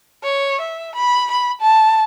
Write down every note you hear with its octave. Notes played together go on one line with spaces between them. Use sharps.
C#5
E5
B5
B5
A5